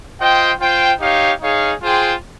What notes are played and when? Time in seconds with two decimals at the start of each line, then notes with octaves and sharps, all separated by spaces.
0.20 F4 C5 D#5 G5
0.60 F4 C5 G5
1.00 D#4 G4 C#5 F5
1.41 D#4 G#4 C#5 F5
1.82 F4 G#4 C5 G5